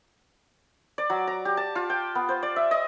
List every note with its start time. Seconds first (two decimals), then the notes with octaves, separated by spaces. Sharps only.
0.98 D5
1.10 F#3
1.27 A#5
1.45 G4
1.57 A5
1.75 F4
1.90 G5
2.15 B3
2.29 C5
2.43 D5
2.56 E5
2.71 D#5